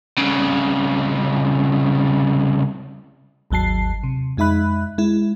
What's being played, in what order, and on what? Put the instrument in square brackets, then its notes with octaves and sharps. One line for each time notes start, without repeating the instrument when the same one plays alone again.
[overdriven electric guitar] C2 C#3
[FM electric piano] G#1 D#2 F#3 A5 C7
C3
F2 G#3 D#4 E5 B5 F#6
G#3 E4